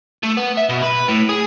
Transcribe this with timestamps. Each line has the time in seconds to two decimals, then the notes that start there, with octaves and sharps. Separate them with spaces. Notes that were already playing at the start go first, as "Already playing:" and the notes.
0.23 A3
0.37 B3
0.57 E5
0.69 B2
0.82 B4
1.08 A2
1.29 G#4